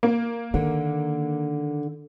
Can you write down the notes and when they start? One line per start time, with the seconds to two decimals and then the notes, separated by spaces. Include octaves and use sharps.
0.03 A#3
0.54 D3 D#3